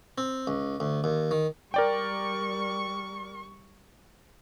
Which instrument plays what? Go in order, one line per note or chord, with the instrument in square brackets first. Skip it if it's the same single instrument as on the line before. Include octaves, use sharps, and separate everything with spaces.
[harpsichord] C4
C#2
D2
D#2
D#3
[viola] G3 C#6 [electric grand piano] A#4 D5 G5